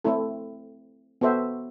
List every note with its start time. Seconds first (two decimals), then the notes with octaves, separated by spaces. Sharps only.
0.04 A3 C4 E4 A4
1.21 B3 F#4 A4 C5 E5